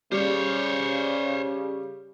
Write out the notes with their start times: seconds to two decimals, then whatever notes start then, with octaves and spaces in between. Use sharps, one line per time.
0.12 C#3 G3 C5 C#5